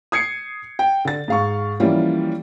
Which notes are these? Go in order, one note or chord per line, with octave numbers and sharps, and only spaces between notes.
D#6 G#6 C7 C#7
G5
D3 A6
G#2 F5 C#6
E3 F3 G3 A#3 C#4 F4